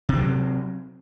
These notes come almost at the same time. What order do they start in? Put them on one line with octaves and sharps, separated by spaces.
C3 C4 F#3